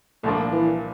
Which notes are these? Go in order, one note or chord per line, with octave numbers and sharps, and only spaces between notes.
C2 A#2 F3 A3 A#3 D4
E3